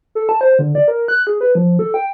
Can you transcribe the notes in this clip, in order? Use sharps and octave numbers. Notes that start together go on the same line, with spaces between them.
A4
A5
C5
D3
D5
A#4
F#6
G#4
B4
F3
A4
G5